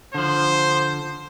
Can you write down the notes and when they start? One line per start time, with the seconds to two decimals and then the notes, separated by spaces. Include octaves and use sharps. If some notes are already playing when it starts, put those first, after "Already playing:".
0.14 D3 F3 C5